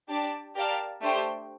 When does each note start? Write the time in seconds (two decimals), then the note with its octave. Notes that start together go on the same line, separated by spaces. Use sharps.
0.09 D4 G4 D5 A5
0.55 G4 A#4 D5 F5 A5
1.01 A3 D4 G4 C5 G5